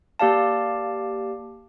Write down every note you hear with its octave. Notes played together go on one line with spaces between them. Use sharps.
A#3 G4 D5 F5 A5